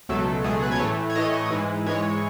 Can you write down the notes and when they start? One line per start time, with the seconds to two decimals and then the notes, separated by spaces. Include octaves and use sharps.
0.09 C#2 B2 F#3 A3 A4
0.44 C#2 B2 F#3 A3 G#4
0.63 B4
0.71 C#5
0.80 A2 E3 A3
1.10 C#5
1.15 A2 E3 A3 D#5
1.51 G#2 E3 G#3
1.86 G#2 E3 G#3 C#5